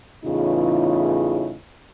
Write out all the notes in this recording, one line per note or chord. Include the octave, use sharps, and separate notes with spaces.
E2 A2 C#3 E3 D#4 F4